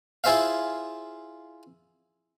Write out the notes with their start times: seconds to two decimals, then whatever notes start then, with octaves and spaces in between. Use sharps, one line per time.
0.24 E4 F4 G#4 C5 E5 F5